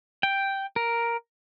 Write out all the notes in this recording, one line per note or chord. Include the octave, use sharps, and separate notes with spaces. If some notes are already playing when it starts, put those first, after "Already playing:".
G5
A#4